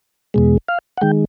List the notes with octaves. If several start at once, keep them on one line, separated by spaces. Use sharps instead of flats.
E2 B2 G#3
F5
F#5
D#3 G#3 G5